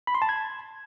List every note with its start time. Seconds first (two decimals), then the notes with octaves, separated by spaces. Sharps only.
0.07 B5
0.15 C6
0.22 A5
0.29 G#6